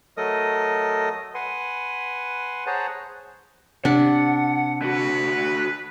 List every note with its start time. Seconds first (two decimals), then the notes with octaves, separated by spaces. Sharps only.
0.17 F#3 A3 A4 A#4 D#5 D#6
1.35 B4 F#5 G#5 C6
2.67 G#4 C5 C#5 F#5 A5 A#5
3.85 C3 D4 F#5
4.82 D3 F#4 B4